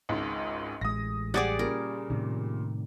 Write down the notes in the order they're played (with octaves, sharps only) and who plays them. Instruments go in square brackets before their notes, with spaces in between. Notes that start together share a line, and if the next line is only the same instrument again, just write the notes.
[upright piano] G#1 C#2 G#2
[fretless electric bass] A1 G#3 [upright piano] D#6 A#6
[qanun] G3 G#4 D5 [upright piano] F#5 D6 A6
[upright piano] A#2 C#3 [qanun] A#4
[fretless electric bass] A2 C3 D#3